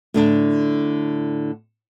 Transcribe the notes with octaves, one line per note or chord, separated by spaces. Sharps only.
A2 D3 D4